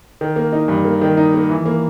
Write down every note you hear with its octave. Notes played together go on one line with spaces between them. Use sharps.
D#3
A#3
D#4
G2
A#3
D#3
D#4
A#3
E3
A#3